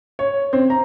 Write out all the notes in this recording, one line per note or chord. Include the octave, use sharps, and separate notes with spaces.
C#5
C4
A#5